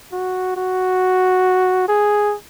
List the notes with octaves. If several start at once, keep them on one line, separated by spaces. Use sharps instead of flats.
F#4
F#4
G#4